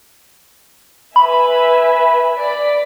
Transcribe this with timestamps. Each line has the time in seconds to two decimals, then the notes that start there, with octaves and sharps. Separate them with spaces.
1.16 B4 E5 G#5 B5
2.40 D5 B5